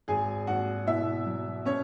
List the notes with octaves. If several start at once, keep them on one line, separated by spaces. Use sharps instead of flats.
G#1 G#4 G#5
G#1 F#4 F#5
B2 E4 E5
F#3
B2 C#4 C#5